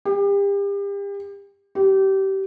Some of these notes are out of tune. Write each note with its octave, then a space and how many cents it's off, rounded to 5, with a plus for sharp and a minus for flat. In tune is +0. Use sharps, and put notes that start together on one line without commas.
G4 +35
G4 -25